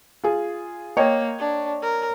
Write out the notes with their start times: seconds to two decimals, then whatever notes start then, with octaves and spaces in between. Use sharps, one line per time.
0.24 F4 G#4
0.97 A#3 C#5 D#5 G5
1.39 D4
1.82 A#4